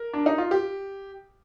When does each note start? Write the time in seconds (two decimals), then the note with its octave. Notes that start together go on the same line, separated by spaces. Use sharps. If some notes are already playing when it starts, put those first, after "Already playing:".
Already playing: A#4
0.13 D4
0.26 D#4
0.38 F4
0.51 G4